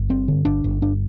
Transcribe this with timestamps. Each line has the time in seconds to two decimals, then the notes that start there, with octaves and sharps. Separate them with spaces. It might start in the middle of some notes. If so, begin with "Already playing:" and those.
Already playing: G1
0.09 G2 C4
0.28 D3
0.45 G1 D4
0.64 G1
0.82 G2 D4